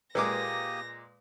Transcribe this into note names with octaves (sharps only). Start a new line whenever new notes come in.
A#2 G#3 A#3 G4 B4 D6 D#6 A#6